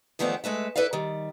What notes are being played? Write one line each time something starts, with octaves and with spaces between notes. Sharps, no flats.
E2 D#3 F3 A3 B3 D5
G#3 A3 B4 E5
E4 A4 B4 D5 E5 F5
D#3 G3